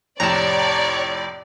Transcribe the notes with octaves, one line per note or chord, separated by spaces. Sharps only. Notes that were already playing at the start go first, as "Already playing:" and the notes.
F2 A2 C3 C#5 D5 A5 A#5